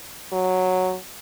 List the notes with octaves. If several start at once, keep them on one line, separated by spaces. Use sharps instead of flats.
F#3